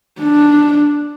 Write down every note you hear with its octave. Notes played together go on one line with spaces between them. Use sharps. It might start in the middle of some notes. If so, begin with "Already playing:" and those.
D4